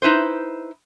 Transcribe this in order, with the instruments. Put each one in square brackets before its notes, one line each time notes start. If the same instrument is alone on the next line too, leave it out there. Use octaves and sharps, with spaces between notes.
[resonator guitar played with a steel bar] D#4 E4 B4 C5